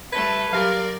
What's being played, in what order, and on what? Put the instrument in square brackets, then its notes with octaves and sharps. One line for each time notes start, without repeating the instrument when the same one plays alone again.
[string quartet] G3 A3 A4 [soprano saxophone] B4 [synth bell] G#6
[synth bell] F#3 G4 [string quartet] A#4 D5 [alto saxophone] F5